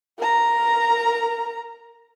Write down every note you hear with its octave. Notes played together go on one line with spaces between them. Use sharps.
A#4 A#5